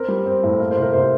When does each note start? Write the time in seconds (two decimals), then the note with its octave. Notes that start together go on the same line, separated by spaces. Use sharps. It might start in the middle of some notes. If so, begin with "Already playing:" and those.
Already playing: C4 A#4
0.08 G3
0.26 C4
0.43 A2
0.60 A#3 A#4
0.71 C5
0.77 C3
0.82 A#4
0.93 C3 C5